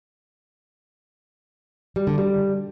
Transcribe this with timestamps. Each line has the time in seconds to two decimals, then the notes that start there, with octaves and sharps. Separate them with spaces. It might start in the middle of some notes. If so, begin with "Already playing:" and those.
1.96 G3
2.07 D3
2.18 G3